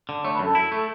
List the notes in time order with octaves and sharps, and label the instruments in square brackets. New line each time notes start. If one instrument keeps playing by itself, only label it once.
[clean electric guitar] D3
[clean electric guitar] A3 [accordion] C#5
[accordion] B4
[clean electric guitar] F#2
[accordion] A4
[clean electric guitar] E4
[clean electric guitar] A3 [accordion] A4